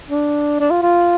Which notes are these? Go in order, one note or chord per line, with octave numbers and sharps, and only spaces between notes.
D4
D4
F4
F4